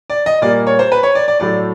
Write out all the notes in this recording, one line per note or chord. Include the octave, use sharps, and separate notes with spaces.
D5
D#5
A#2 G3 A#3 D5
C#5
C5
B4
C#5
D5
D5
A2 F#3 A3 D5